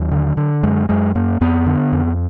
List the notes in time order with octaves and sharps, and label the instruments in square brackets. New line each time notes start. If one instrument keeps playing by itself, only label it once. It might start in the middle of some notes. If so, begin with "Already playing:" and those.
Already playing: [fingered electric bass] D#2 F#3
D3
D3
F#2 G#3
F#2 G#3
F#2 A#3
F2 B3
D3
F2